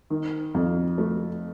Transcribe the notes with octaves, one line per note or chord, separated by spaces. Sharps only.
D#3
F2
A3